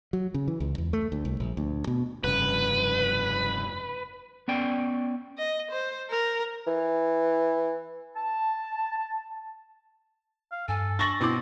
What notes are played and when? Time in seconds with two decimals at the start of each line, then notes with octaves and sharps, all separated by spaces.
0.13 F#3
0.34 C#3
0.48 E3
0.60 C#2
0.78 E2
0.93 A3
1.12 D2
1.25 C2
1.40 A#1
1.57 D2
1.87 B2
2.24 F1 G2 C#3 B4
4.48 B3 C#4 D5 G5
5.38 D#5
5.71 C5
6.10 A#4
6.67 E3
8.16 A5
10.52 F5
10.68 G2 A4 G#5
10.99 D4 C#6 A6 A#6 F#7
11.20 B2 C4 E4 D6